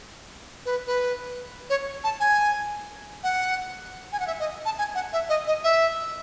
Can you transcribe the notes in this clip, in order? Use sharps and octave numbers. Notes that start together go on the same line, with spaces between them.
B4
B4
C#5
A5
G#5
F#5
G#5
F#5
E5
D#5
A5
G#5
F#5
E5
D#5
D#5
E5